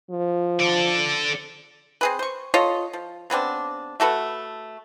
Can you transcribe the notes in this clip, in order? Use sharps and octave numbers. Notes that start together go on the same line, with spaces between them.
F3
A4 D5
C4 G#4 B4
C5 C#6
F4 A4 C#5 D#5
F3
C#3 B3 C4 D4
A3 F#4 A4 B4